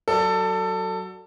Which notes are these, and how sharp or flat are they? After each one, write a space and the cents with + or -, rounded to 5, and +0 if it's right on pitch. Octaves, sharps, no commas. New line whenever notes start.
F#3 +10 A4 +20 D5 +10